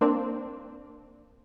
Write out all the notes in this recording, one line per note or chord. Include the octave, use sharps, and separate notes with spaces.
A#3 C4 D4